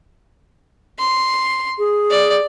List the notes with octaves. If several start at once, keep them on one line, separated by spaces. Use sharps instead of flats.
C6
G#4
D5